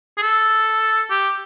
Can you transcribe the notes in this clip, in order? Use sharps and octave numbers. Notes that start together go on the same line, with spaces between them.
G#4
A4
G4